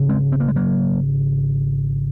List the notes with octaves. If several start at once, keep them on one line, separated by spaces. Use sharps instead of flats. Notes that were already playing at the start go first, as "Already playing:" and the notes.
Already playing: G#1 C#3
G#3 C4
C4
A#3
G#3
F#3 A#3